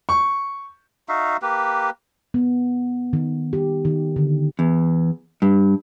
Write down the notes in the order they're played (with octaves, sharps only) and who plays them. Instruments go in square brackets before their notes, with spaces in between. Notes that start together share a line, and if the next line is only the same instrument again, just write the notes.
[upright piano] C#6
[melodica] D#4 F#4 E5 F5
A#3 G4 B4
[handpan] B3
D#3
G4
D#3
D3
[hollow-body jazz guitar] E2
G2